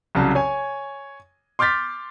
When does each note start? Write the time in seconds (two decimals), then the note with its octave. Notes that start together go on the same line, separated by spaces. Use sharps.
0.15 C2 C#3 F#3 A5
0.35 C#5 G#5
1.59 C6 D6 F6 G6 A6 B6